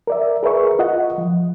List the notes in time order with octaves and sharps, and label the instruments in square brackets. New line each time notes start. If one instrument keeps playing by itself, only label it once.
[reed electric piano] A#4 D5 E5
G#4 A#4 B4 E5 C#6
F4 D#5 F#5
F3